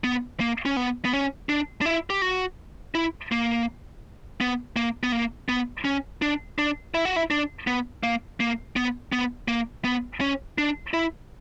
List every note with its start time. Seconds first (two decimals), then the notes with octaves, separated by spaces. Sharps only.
0.04 B3
0.40 A#3
0.66 C#4
0.77 B3
1.05 B3
1.13 C#4
1.49 D4
1.81 D4
1.86 E4
2.10 G4
2.22 F#4
2.95 E4
3.32 A#3
4.41 B3
4.76 A#3
5.03 B3
5.12 A#3
5.49 B3
5.85 C#4
6.22 D4
6.58 D4
6.94 E4
7.05 F#4
7.16 E4
7.31 D4
7.67 B3
8.03 A#3
8.40 A#3
8.76 B3
9.12 B3
9.48 A#3
9.84 B3
10.21 C#4
10.58 D4
10.94 E4